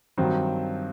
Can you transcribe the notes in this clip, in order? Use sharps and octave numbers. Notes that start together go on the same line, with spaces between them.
G2 D#3 F#3 C4